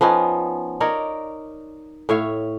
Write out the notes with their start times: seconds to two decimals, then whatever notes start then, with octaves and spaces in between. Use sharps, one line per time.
0.01 F3 B3 C#4 D#4
0.80 D#4 A#4 C#5 D5
2.09 A2 C#5 E5 F5